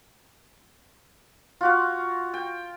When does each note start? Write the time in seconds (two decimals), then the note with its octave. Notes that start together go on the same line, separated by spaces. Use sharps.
1.61 F4 F#4 F5
2.34 G5